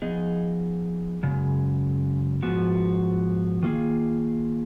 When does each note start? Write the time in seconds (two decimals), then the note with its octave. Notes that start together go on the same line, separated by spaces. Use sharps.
0.02 F3 B3 D#4 G#4 D#5
1.23 F#2 C#3 G#3
2.42 G#2 F3 B3 F#4
3.63 D#3 A#3 F4 G#4